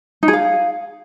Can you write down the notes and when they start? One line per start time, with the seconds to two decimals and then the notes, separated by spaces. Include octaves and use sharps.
0.23 D#4
0.28 G#4
0.33 F5